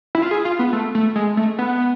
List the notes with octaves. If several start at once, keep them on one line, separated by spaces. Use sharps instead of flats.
E4
F4
G#4
F4
B3
A3
A3
G#3
A3
B3